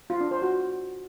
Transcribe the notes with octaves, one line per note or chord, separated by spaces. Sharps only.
F4
D4
C5
F#4